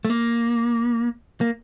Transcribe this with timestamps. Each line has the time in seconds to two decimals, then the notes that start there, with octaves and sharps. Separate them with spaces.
0.05 A3
0.10 A#3
1.41 A#3